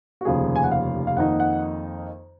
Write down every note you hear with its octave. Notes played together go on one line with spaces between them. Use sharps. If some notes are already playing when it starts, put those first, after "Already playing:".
F#4
F1 D#2 C#3 F3 A#3 G#4
G#5
F#5
F5
F5
F2 D#3 A#3 D#4 F#5
F#5